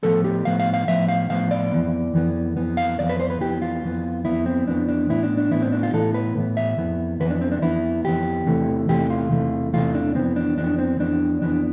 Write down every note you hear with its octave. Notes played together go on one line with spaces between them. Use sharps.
A2 F3 B3 A4
G4
A2 F3 B3 F5
F5
F5
A2 F3 B3 E5
F5
A2 F3 B3 F5
D5
F2 E3 B3
F2 E3 B3
F2 E3 B3
F5
F2 E3 B3 D5
B4
C5
B4
F2 E3 B3 G4
F4
F2 E3 B3
F2 E3 B3 E4
C4
F2 E3 B3 D4
D4
A2 E3 B3 E4
D4
D4
A2 E3 B3 E4
C4
D4
F4
A2 E3 B3 A4
B4
A2 E3 B3
E5
F2 E3 B3
F2 E3 B3 B4
D4
C4
D4
F2 E3 B3 E4
F2 E3 B3 G4
E2 C3 E3 A3
E2 C3 E3 A3 G4
F4
E2 C3 E3 A3
E2 C3 E3 A3 F4
D4
F2 E3 B3 C4
D4
F2 E3 B3 D4
C4
F2 E3 B3 D4
F2 E3 B3 D4